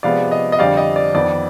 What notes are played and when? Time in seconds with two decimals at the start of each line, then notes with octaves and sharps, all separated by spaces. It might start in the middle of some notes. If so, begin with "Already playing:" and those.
0.03 C3 F3 G#3 B3 D5 F5
0.31 D#5
0.52 D#5
0.59 F2 D3 G3 C4 D5 F5
0.77 D#5
0.96 D5
1.14 F2 D#3 B3 D5